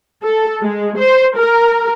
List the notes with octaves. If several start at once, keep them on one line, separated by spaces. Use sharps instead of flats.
A4
G#3
C5
A#4